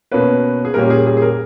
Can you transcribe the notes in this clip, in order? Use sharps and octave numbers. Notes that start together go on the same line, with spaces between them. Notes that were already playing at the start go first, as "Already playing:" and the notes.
B2 A#3 C#4 B4
G#4
A#2 G3 A#3 C#4 A#4
G#4
G#4
G#4
A#4